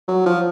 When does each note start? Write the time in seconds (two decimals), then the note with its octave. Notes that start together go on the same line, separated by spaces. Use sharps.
0.08 F#3
0.26 F3